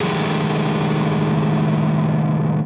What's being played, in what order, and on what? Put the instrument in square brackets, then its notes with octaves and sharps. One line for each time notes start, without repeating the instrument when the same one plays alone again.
[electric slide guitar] D#3 F3 G#3 A3 G4 G#4